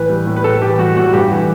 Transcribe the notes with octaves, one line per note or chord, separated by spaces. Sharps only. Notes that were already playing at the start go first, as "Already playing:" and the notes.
Already playing: A2 E3 B4
G3
A2
B4
A2 A4
E3 G4
G3 F#4
A2 F#4
G2 G4
E3